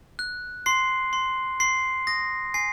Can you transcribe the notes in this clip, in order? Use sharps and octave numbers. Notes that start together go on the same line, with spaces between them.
F#6
C6 C7
C6
C6 C7
D#6 A#6
G#5 C7